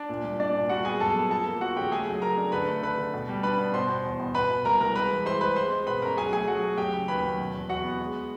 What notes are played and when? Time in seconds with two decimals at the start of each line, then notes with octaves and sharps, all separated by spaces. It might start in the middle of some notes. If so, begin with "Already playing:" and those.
Already playing: D4 D5
0.09 A#2
0.24 C2
0.39 A#2 D4 D5
0.54 A#2
0.69 G3 F#4 F#5
0.85 B3 G#4 G#5
1.00 F#2 A4 A5
1.16 B3
1.30 F3 A4 A5
1.46 A#3
1.61 F3 F#4 F#5
1.76 C#3 G4 G5
1.92 A3 G#4 G#5
2.07 F#3
2.22 A3 A#4 A#5
2.37 D4
2.52 D3 B4 B5
2.68 A3
2.82 D3 B4 B5
2.98 D3
3.14 B2
3.29 G3
3.43 D4 B4 B5
3.59 B3
3.74 B2 C5 C6
3.89 B2
4.04 E2
4.20 B2
4.35 B2 B4 B5
4.50 B2
4.65 C2 A#4 A#5
4.80 C2 A#4 A#5
4.95 G#3 B4 B5
5.11 E3
5.26 G#3 C5 C6
5.41 G#3 B4 B5
5.56 G#3 C5 C6
5.72 G#3
5.87 B2 B4 B5
6.02 C#4 A#4 A#5
6.17 F#3 G#4 G#5
6.32 A3 G#4 G#5
6.47 F#3 F#4 F#5
6.63 A3
6.78 F#3 G4 G5
6.94 C#3
7.08 D#2 B4 B5
7.24 F#3
7.39 B2
7.54 E2
7.69 E2 F#4 F#5
7.84 B3
8.00 G#3